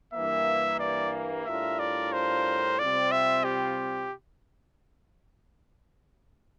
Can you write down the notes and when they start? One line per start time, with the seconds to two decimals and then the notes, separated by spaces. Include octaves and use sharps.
0.13 G2 E3 A#3 E5
0.79 D5
1.46 A2 G3 D4 F4 A#4 E5
1.79 D5
2.13 C5
2.79 C3 G3 C4 F4 D5
3.11 E5
3.44 G4